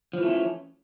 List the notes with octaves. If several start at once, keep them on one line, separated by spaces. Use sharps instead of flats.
E3 F3 A3 C#4